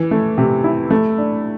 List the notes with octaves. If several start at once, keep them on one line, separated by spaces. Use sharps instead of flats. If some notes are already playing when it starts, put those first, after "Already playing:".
Already playing: E3
A3
C3
E4
A3
D4